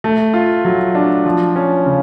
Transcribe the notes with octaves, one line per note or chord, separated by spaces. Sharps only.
A3
F4
F#3
D4
F3
C#4
C#3